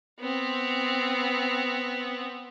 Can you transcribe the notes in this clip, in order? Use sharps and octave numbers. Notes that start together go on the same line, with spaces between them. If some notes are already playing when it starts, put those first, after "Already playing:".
B3 C4